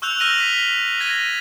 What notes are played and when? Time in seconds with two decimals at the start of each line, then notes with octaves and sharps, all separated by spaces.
0.02 C#6 E6 F#6 G6 F7
0.19 E6 F6 A#6 D#7 F7 F#7
0.40 B6
1.00 G#6 A#6 D#7